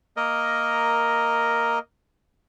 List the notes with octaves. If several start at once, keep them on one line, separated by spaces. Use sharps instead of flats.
A#3 A#4 D#5